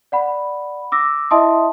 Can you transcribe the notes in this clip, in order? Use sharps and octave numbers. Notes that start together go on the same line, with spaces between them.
D5 F#5 B5
D6 E6 A#6
E4 D#5 E5 A5 C6 D#6